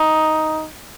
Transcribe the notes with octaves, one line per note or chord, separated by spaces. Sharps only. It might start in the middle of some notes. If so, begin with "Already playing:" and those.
Already playing: D#4